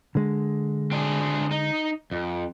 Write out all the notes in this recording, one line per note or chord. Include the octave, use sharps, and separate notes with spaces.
D3 G#3
C4 D4 G#4
D#4
F2